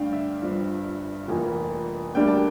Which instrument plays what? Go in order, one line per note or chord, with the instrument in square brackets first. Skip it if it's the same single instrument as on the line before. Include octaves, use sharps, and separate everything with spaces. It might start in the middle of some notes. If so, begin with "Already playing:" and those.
Already playing: [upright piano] G2 D3 A3 D4 F5 G5
E5
G1 G2 F3
F1 F2 E3 A#3
D2 D3 G3 A#3 D4 G5
A5